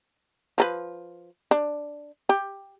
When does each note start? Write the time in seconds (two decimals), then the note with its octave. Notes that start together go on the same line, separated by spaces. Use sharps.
0.58 F3 A4 B4
1.51 D4
2.29 G4